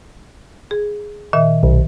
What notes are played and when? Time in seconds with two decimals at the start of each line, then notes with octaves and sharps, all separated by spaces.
0.71 G#4
1.33 A#2 D#3 E5
1.63 B1